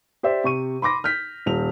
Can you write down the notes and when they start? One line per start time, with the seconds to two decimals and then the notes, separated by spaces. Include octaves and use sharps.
0.23 G4 C5 D5 E5
0.44 C3 C#6 D#7
0.82 B5 C6 D6 A#6
1.04 F6 G6 B6
1.46 D#1 F7